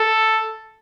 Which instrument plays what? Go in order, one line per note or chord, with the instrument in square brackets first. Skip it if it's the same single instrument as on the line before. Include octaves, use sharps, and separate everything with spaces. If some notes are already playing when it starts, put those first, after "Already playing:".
Already playing: [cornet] A4